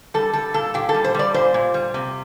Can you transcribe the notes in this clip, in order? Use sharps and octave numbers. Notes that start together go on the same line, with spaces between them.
G3 A4
G3 A4
A#2 A4
A#2 G4
A4
G3
C5
G3 D5
A#2 C5
A#2
G3
C3